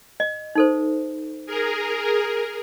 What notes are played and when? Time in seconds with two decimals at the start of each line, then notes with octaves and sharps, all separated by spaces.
0.20 D#5
0.55 D#4 A4 C5
1.46 G#4 A#4